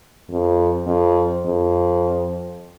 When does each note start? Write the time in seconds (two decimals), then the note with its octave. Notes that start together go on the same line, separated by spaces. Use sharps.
0.30 F2
0.87 F2
1.45 F2